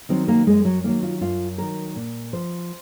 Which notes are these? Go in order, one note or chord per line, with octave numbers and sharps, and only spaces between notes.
D#3 F#3 C4
A#3
F#2 G#3
F#3
D#3 F#3 A#3
F4
F#2 F4
D#3 F#3 A#4
A#2
F3 C5